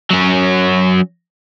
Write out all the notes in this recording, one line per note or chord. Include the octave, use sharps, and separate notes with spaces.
F#3 C#4